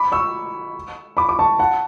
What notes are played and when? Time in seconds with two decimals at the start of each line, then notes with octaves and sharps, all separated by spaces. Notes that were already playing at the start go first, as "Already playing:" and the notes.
Already playing: B5 D6
0.12 C#6 E6
1.17 B5 D6
1.29 D6
1.39 A5 C#6
1.59 F#5 A5